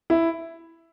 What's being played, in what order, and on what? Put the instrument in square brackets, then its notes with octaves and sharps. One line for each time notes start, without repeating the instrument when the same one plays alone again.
[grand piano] E4